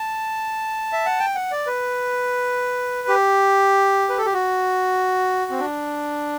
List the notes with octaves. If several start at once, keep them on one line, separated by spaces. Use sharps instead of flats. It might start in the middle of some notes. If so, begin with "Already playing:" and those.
Already playing: A5
E5
F#5
G5
F#5
D5
B4
G4
B4
A4
G4
F#4
C4
D4